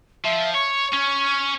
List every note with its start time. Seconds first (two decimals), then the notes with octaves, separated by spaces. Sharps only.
0.25 F3 E5
0.54 C#5 C#6
0.93 C#4